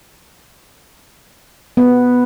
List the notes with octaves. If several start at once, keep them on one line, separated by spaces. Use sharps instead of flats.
B3